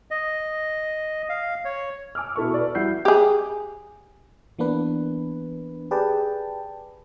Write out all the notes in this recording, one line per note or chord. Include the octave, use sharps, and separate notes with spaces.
D#5
F5
C#5
G#5 D6 E6 F6
B2 E4 A4 C#6
B4 D5
G3 E4 F#4 G6 C7
G4 G#4
E3 A#3 B3 D4 B4
G4 G#4 B4 D5 G5 A5